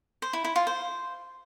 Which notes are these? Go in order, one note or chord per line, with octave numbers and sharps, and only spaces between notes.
C5
E4
E4
F4
C5